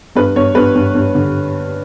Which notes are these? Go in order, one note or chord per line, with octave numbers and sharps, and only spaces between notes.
G2 B4
G2 C#5
G2 B4
G2
G2
D3